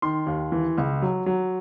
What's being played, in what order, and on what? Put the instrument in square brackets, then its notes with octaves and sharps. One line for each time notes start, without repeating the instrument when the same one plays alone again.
[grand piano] D#3 C6
D#2
E3
C#2
F#3
F#3